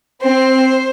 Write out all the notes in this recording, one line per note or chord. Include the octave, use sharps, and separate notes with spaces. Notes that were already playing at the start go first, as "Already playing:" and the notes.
C4 C5